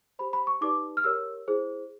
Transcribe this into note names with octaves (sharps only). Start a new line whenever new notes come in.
G4 C5 B5
B5
C#6
D#4 G4 B4 D5 D6
F6
G4 A#4 C#5 E6
E4 G#4 C5